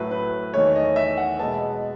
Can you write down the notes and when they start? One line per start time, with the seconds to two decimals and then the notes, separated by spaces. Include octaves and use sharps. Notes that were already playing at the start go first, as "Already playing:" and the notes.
Already playing: A2 F#3 A3 B4
0.11 B4
0.54 E2 D#3 A3 C#5
0.76 D#5
0.96 E5
1.17 F#5
1.39 B2 G#3 B3 A5